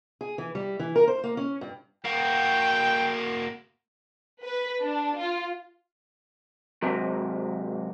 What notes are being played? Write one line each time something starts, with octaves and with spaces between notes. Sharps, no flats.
G#4
E3
G3
E3
A#4
C5
A#3
C#4
G2
A#3 F#4 G5
B4
D4
F4
G#2 C3 F#3